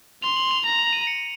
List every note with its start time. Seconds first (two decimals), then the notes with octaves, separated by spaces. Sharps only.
0.22 C6 F7
0.36 F#7
0.51 F7
0.64 A#5 F7
0.79 F7
0.93 D#7
1.07 C#7